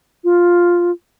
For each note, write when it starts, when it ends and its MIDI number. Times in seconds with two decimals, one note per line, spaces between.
0.24 0.91 65